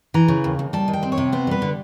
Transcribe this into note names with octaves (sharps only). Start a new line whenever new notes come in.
E3 A#5
C#3
D#2
D#2
G3 A5
D#3
G5
C4
C#5
C3
B3 C5
G3 B4
D3